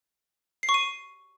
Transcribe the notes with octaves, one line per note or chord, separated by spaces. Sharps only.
C7
C#6
D#7